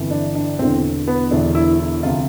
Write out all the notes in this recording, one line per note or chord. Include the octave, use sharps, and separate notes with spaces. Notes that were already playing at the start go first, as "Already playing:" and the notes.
Already playing: G1 F2 E3
D4
D4
E1 E2 D3 C4
B3
E1 E2 D3 D4
E4
E4
D2 C3 F3 F4